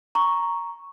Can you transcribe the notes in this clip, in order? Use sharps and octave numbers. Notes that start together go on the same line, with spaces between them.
A#5 C#6